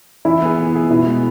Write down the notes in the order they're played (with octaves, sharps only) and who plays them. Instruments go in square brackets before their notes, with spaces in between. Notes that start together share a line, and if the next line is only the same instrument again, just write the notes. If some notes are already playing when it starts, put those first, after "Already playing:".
[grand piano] E3 [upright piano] E4
[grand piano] B3 G#4
E3
B3 G#4
[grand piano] B2 [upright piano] E4
[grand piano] G#3 B3